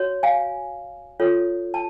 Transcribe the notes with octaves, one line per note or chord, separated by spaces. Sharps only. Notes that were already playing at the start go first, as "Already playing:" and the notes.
Already playing: F#4 C#5
F5 G#5
F4 A4 C#5
A5